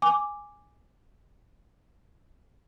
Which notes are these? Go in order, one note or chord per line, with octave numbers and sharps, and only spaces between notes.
G#5 D6